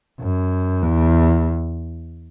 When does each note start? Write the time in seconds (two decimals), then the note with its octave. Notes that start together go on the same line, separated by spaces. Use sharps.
0.20 F#2
0.82 E2